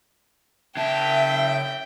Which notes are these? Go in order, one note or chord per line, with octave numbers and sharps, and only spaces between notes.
C#3 E5 G5 A5